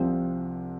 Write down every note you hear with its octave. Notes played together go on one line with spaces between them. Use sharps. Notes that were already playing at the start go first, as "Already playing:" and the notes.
Already playing: C2 C3 F3 C4